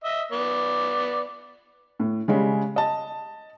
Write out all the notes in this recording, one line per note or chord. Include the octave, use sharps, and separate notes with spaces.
D#5 E5
B3 D5
A2
C#3 G3 G#3
D#5 A5